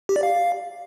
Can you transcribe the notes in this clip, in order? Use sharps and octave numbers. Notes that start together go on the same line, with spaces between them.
G4
D5
F5